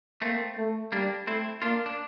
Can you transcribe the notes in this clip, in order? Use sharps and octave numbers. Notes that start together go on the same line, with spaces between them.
A3 A#3 C4
A3
G3 A#3 D4
A3 C4 E4
A#3 D4 F4
D4